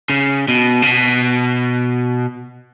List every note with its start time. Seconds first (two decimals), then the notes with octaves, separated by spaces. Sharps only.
0.10 C#3
0.48 B2
0.82 C#3
0.87 B2